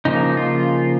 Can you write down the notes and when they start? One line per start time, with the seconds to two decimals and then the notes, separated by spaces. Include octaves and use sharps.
0.05 C#3 F3 A#3 D#4
0.37 F4